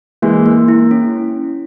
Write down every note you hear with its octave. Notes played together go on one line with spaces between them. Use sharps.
E3 G#3 A#3
A#3
E4
C#4